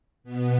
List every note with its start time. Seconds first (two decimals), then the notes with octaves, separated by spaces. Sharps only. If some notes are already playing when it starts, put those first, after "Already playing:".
0.24 B2 B3